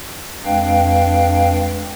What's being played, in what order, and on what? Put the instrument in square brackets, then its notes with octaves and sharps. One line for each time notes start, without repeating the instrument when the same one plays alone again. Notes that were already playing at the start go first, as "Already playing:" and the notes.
[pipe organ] F2 G#3 D4 B4 F5 G5